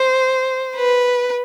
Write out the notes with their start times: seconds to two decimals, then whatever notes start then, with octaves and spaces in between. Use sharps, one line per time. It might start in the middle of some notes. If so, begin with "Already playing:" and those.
Already playing: C5
0.76 B4